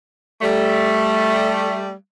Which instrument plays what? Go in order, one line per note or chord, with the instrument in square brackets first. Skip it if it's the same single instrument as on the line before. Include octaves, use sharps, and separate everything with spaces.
[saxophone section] G3 A3